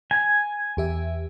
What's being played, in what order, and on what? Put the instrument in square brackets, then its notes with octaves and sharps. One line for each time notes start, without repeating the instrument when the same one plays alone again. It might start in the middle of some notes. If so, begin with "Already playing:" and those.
[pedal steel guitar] G#5
[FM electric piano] E2 G4 E5